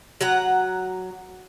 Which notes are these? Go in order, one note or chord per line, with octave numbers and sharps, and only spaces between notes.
F#3 F#5 A#5